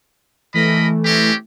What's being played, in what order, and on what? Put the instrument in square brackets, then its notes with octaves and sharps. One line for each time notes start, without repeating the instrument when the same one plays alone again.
[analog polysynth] E3 A3 [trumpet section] A#4 D#5 B5
[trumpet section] C4 C#4 G4